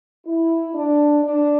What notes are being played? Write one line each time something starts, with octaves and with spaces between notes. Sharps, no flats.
E4
D4
D4